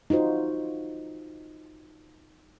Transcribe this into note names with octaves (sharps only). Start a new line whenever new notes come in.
D#4 F4 F#4 C5